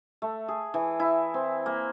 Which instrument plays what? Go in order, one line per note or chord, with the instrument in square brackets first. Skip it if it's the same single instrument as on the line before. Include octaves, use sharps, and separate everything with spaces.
[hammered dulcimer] A3
G#4
E3
E4
C4
A#3